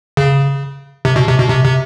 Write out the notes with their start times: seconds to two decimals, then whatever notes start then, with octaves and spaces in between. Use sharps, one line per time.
0.17 C#3
1.05 C3
1.16 B2
1.28 C3
1.38 B2
1.50 C3
1.64 C3